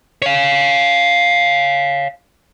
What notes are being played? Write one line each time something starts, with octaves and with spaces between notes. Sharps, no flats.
C#5 F5